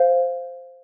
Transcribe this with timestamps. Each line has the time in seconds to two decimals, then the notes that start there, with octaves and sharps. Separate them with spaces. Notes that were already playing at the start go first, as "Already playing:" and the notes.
Already playing: C5 F5